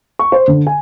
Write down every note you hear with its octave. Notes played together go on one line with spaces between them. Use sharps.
C#6
C5
D3
G#5